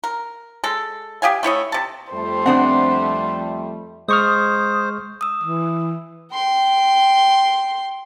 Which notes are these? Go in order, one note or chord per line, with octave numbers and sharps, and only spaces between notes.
A#4
G#3 A4
G4 D#5 F5 G#5
A3 E4 C#5 D#5
C3 A5
F2 G3 A3 C5
B3 C4 D4 F#5
G#3 C5 C#6 D#6 F6
D#6 E6
E3
G5 C6